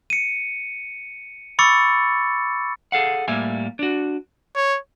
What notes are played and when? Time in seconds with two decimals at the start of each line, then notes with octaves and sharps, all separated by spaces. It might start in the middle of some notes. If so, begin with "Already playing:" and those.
0.10 C#7 D#7
1.59 B5 C#6 D6 E6 A6 C#7
2.92 G#4 A4 F5 F#5
3.28 A2 G3 A#3 E5 G#5
3.79 D4 F#4
4.55 C#5